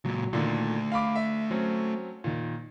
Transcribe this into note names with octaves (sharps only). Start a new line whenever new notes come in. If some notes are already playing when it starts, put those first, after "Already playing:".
C#2 A#2 F#3
A#2 D3 D#3 A3 D5
F5 B5 D6
E5
F#3 C4 C#4
A#2 D#3